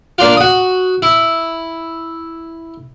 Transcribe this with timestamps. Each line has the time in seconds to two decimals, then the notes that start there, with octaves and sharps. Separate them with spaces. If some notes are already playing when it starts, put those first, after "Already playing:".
0.18 A#3 D4 F4
0.37 F#4 D#6
1.02 E4